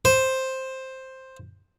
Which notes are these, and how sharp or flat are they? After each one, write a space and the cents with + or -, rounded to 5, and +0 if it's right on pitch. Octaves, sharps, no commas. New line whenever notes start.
C5 +5